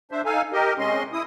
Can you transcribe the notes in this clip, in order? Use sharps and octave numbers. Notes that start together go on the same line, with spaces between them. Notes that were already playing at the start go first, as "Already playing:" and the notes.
D4 C5 E5
D#4 A4 F5 G#5
G4 A#4 D#5
C3 G#3 C#4 D#5 C6
E4 D#6